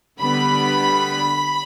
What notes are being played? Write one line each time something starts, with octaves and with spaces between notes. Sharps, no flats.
D3 G3 B3 B5